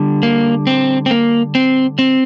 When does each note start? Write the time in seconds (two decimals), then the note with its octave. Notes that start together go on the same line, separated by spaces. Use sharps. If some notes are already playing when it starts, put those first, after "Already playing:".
Already playing: D3 G3
0.23 A#3
0.67 C4
1.06 C4
1.11 A#3
1.55 C4
1.99 C4